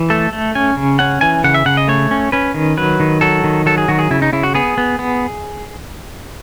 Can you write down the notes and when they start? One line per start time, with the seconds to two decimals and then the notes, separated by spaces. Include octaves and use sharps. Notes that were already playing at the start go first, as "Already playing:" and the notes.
Already playing: E3
0.10 A3 A4
0.33 A3
0.55 C#4 G#5
0.77 C#3
0.99 C#4 F#5
1.21 E3 G#5
1.44 C#3 F#5
1.54 E5
1.66 C#3 F#5
1.77 D#5
1.88 A3 C#5
2.11 C#4
2.32 C#4 B4
2.54 D#3
2.77 F#3 B4
3.00 D#3
3.21 F#3 A4
3.44 D#3
3.66 F#3 A4
3.78 G#4
3.88 D#3 F#4
3.99 G#4
4.11 C#3 E4
4.22 D#4
4.33 C#3 E4
4.43 F#4
4.55 B3 G#4
4.78 B3
4.99 B3